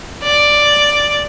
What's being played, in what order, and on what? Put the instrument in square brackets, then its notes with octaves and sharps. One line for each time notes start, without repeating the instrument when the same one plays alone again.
[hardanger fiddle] D5